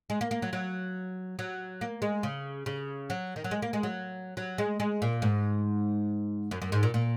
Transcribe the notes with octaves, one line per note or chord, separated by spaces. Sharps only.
G#3
A#3
A#3
F#3
F#3
F#3
A#3
G#3
C#3
C#3
F#3
D#3
F#3
G#3
A#3
G#3
F#3
F#3
G#3
G#3
A#2
G#2
F#2
F#2
G#2
A#2
A#2